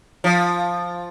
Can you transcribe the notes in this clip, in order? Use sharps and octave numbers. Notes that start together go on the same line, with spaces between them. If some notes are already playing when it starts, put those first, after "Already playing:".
F3